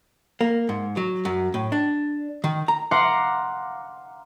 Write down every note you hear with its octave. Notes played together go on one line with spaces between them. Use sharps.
A#3
G#2
F#3
F#2
A2
D4
D#3
A#5
F5 F#5 A#5 C6 D6